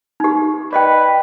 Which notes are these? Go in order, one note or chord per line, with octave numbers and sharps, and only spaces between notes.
D#4 G4
B4 D5 D#5 G5